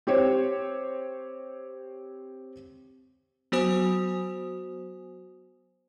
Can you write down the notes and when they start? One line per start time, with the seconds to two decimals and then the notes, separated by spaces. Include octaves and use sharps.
0.07 C4 G4 C5 C#5
3.52 F#3 B3 F#4 C5 G#5 D#6